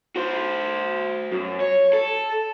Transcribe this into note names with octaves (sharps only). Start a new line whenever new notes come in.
F#4 C5
F#2
C#5
A4